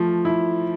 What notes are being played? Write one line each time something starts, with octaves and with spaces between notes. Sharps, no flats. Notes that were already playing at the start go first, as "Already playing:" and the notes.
Already playing: F3 A3
E4